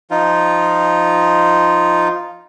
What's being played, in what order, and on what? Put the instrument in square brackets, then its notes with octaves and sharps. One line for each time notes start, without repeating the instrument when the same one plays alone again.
[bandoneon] F3 D#4 F4